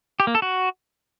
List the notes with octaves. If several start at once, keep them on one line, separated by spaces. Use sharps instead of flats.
G4
A#3
A4
F#4